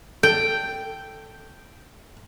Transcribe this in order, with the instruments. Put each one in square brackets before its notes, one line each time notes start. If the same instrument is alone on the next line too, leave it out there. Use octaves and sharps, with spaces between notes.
[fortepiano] A4 [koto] G5